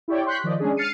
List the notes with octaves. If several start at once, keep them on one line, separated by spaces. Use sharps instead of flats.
E4 G4 C#5 D5 G5
C6 C#6 F#6 G6 B6
D#3 F3 D5 D#5
G#3 C#4 D4 G#4
F6 A6 C7 C#7 D#7